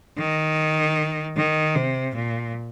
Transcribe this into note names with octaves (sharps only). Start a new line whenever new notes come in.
D#3
D#3
C3
A#2